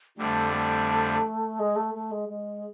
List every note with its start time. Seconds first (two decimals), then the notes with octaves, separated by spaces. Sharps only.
0.17 F2 D3 G3 A3
0.53 A3
1.59 G#3
1.76 A3
1.95 A3
2.11 G#3
2.29 G#3